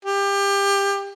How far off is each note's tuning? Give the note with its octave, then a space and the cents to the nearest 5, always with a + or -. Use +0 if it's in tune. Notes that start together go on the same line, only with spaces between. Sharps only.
G4 +25